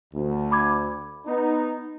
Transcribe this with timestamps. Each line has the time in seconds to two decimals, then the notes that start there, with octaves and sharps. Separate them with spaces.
0.13 D2
0.51 B5 D6 G#6
1.26 B3 D#4